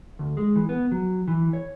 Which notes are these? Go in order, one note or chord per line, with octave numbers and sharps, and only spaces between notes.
D2
G#3
E3
B3
F#3
E3
C#5